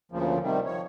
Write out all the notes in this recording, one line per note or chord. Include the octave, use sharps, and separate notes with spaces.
D2 A#2 C#3 F3
C3 D#3 G3
F3 C#5